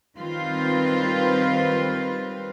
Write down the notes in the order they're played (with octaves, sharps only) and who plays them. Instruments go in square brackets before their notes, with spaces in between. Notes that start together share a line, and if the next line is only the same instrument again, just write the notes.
[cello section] D#3 G3 C4 F4 B4